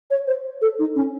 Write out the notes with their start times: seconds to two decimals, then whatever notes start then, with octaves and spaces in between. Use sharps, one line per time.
0.11 C#5
0.27 C5
0.62 A4
0.79 D#4
0.96 C#4